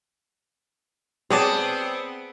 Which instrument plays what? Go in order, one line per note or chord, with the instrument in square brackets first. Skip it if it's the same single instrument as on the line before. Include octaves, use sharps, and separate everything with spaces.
[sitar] B3 [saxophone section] C4 [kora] G#4 [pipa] C#5 D5 A5